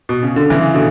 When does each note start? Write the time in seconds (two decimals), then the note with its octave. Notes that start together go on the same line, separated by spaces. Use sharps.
0.09 B2
0.23 C#3
0.36 D3
0.50 C#3 E3
0.74 B2 D3